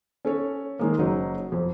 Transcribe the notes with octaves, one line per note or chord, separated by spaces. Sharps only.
C#4 A4 C#5
D#3 G#3 A#3
F#1 F#3 D#4
F2